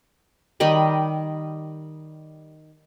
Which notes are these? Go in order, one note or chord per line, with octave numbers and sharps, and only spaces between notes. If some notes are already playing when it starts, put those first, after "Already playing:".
D#3 G3 D#5 B5